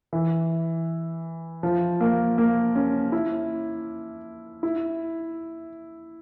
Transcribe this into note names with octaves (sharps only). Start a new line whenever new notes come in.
E3
F3
A#3
A#3
C#4
E4
E4